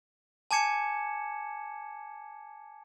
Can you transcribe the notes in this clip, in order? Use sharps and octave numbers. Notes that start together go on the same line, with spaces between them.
G#5 A5 D6 G#6 C#7 E7